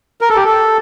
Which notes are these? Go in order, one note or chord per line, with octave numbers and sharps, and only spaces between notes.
A#4
A4
G4
A4